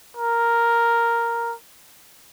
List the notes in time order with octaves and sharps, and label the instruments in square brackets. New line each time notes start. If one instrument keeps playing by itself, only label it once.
[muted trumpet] A#4